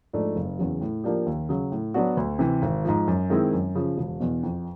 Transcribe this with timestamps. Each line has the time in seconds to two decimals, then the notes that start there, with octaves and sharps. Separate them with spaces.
0.13 G#2 F3 A3 D4
0.36 F#1
0.59 E2 C#3 F#3
0.81 A2
1.04 F3 A#3 D4 G4
1.26 D#2
1.49 C#3 F#3
1.72 A2
1.94 F#3 B3 D4 F#4
2.17 D2
2.39 C3 E3
2.62 G#1
2.85 G#2 F3
3.08 F#2
3.30 D#3 G#3 C4 E4
3.53 F#2
3.75 C#3 F3
3.98 E1
4.20 E2 B2
4.43 F2